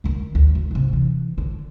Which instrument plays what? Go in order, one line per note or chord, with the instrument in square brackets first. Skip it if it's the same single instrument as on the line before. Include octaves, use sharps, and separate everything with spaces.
[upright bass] D3 D#3
D2
A3
G#2 C3
E3
D3